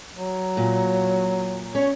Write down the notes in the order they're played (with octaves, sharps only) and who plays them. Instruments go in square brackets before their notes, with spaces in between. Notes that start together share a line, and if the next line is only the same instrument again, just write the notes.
[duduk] F#3
[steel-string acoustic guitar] A#2
[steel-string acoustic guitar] C#4 [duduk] C#5